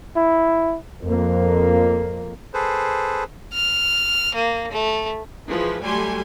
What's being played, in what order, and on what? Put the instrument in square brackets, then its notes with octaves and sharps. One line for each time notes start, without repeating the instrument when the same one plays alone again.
[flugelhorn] E4
[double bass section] F2 A#3
[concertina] G#4 A4 B4 C5
[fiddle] F6
A#3
A3
[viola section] E3 F3 G#3 G#4 B4
F#3 G3 A3 G4 G#5 C6